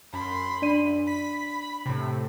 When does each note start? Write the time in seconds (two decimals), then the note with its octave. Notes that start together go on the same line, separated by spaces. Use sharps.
0.13 F#2 B5 C6
0.62 D4 D5 D#7
1.07 B5 B6
1.86 A2 C3